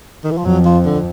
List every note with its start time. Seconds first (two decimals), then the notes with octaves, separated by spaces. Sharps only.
0.24 D#3
0.31 E3
0.37 F3
0.45 F2 F#3
0.65 F3
0.85 D3